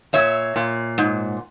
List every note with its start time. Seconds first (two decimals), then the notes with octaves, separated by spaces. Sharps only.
0.13 A#2 C#5 E5
0.56 A#2
0.98 G#2